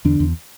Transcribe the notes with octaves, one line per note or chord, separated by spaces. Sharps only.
E2 D3 D4
E2